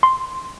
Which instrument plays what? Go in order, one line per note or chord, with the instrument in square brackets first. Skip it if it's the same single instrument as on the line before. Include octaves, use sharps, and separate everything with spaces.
[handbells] C6